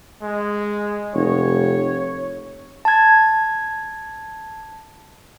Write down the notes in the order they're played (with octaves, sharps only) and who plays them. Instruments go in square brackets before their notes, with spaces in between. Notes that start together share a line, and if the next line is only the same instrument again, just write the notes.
[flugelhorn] G#3
[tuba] F1 [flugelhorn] C#5
[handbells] A5 G#6